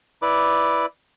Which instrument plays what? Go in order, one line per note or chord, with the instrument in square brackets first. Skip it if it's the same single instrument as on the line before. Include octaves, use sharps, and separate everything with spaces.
[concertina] E4 B4 D5 D6